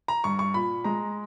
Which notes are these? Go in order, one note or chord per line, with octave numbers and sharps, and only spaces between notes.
A#5
G2 C#6
C#6
A#2 B5
G#3 A#5